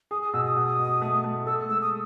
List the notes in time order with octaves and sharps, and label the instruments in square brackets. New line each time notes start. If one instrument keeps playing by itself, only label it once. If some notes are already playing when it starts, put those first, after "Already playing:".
[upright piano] G#4 [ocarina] D#6
[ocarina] D#6
[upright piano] B2 [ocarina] E6
[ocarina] D#6
[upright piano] B2
B2
A3
A3
[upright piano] A4 [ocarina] E6
[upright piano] G#3 [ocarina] E6
[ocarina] D#6